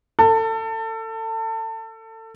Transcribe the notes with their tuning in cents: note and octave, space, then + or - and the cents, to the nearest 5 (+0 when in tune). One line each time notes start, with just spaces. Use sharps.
A4 +25